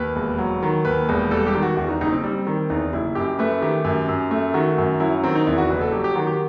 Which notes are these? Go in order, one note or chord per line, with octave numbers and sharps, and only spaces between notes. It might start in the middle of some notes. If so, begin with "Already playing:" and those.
Already playing: D#2 B4
E1
F#3
D#3
D#2 B4
E1
G3 A4
G4
D#3
F#4
E2 F#4
D#4
F#1 D#4
C4
G3
D#3
E2 D#4
F#1 E4
F#2 G4
A3 B4
D#3 G4
F#2
F#2
A3
D#3 F#4
F#2
F#3 E4
D#3 C4
D#4
E2 E4
F#4
F#1 B4
A4
F#3 G4
G4
D#3 F#4
G4